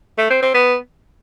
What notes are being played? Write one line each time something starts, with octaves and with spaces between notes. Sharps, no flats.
A3
C4
C4
B3